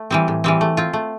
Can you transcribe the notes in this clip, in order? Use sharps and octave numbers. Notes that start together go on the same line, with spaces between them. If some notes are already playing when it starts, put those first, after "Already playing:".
Already playing: A3
E3 G3 C4
A2
E3 G3 C4
A3
C4 F4
A3